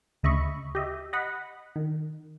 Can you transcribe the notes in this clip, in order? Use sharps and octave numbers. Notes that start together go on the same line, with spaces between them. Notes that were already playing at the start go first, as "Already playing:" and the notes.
D2 C#3 D#5 E5 B5 C#6
G4 D#5 E5
D#5 F#5 B5
D#3